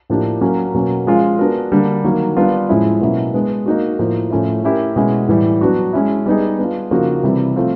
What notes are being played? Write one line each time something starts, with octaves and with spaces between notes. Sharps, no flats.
A2 F3 A#3 D4 G4
F#3 A#3 C#4
B2 F#3 A#3 C#4
F3 G#3 C#4 F4
B3 D4 F#4 A#4
D3 G3 A#3 D4
D#3 F#3 A#3
G3 B3 D4 F4
A2 F3 G#3 C#4 E4
B2 F#3 A#3 C#4 E4
G#3 B3 D4
A#3 D#4 F#4
A2 F3 A#3
A2 F3 A3 C#4 E4
A3 C#4 E4 G4 A#4
B2 G#3 C#4 E4
A2 E3 G3
F#3 B3 D4 F#4
G#3 C#4 E4
G3 B3 D#4 G#4
B3 D4 F4
C#3 F3 A#3 D#4 F#4
C3 E3 G3 C4 E4
F3 A3 C4 F4